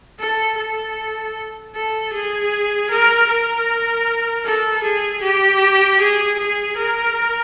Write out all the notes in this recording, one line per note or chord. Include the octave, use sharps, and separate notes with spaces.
A4
A4
A4
G#4
A#4
A#4
A4
G#4
G4
G#4
G#4
A#4